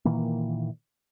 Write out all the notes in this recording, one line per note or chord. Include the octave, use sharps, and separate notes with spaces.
A#2 D#3 E3 A#3